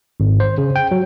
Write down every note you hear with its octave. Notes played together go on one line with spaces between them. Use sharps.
G#1
C5
C#3
G5
F#3